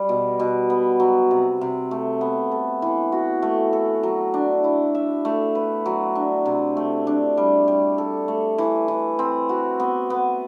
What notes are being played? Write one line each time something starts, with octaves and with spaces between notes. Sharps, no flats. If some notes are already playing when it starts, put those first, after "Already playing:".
Already playing: G3
B2
B2
B3
F#3
C3
C3
A3
B3
A4
E3
F#4
A3
A4
F#3
D4
E4
E5
A3
B4
F#3
D4
C3
A3
D4
G3
G3
A4
A3
E3
E3
C4
F#4
B3
B3